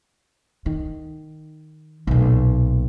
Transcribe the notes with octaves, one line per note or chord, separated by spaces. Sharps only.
D#3
B1 A#2